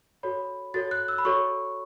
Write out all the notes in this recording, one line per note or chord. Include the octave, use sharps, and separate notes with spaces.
F#4 A4 C#5 B5
F#4 A4 C#5 A6
F#6
E6
B5
F#4 A4 C#5 C#6